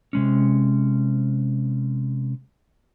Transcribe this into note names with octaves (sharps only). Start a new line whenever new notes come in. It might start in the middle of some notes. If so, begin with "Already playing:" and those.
C3 G#3 C#4